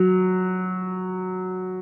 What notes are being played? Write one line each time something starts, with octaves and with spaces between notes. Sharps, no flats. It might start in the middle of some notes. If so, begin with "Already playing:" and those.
Already playing: F#3